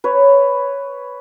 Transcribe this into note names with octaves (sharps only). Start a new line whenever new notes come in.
B4 C#5